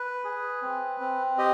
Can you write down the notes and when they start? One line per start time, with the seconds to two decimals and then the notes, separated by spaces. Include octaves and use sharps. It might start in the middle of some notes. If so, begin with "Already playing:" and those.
Already playing: B4
0.24 G#4
0.62 C4
1.00 C4
1.38 G4 D#5